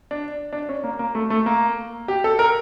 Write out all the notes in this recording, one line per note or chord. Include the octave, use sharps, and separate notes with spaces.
D4
D4
C#4
A#3
A#3
A3
A3
A#3
G4
A4
A#4